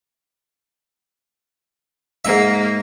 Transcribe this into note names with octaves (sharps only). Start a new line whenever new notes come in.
G#2 A#3 E5